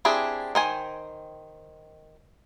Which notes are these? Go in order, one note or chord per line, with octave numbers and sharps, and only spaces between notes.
C4 D4 E4 G4 G#4
D#3 C5 G#5